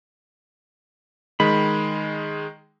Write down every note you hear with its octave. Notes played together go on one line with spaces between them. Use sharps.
D#3 G#3 B5